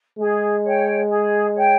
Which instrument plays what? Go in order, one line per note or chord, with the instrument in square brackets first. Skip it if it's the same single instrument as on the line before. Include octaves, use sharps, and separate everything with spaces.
[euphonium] G#3 [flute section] G#4
[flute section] C#5 G5
G#4
C#5 G5